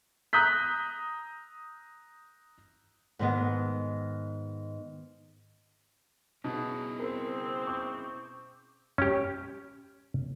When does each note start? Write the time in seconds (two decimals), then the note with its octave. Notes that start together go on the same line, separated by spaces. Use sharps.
0.33 A#5 D#6 F#6 G6 B6
3.19 G#2 D#3 B3
6.44 B2 C#4 D#4 E4 G#4
6.99 C4 A#4
7.67 C#6 D6 G6
8.98 C#4 G4